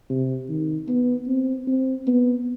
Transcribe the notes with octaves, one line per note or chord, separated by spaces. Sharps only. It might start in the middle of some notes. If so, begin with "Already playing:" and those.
C3
D#3
B3
C4
C4
B3